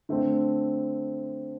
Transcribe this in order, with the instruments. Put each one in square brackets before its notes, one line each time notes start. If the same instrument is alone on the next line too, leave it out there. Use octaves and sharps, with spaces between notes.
[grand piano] D3 A3 C4